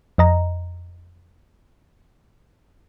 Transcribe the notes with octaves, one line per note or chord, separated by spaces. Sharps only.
F2 D#5 A#5